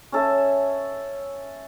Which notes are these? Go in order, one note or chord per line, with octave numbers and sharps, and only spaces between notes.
C#4 A4 E5